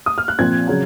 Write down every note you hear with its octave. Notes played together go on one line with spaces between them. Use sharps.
D#6
F6
F#6
A#2 F3 C4 G#6
C#3 F#3